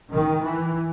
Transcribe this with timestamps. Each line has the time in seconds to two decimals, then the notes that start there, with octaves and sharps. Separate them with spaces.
0.11 D#3
0.42 E3